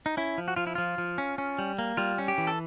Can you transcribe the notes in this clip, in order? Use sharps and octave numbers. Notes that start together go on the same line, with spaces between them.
D#4
C#4 E4
F3
F#4
F3 F4
E4
F3 F4
F3
C#4
C#4
G3
A#3
G3 F4
C#4
G4
E3
A4